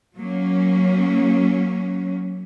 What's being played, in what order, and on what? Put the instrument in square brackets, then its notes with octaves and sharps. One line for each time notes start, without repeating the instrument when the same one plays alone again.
[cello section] F#3 A#3 C#4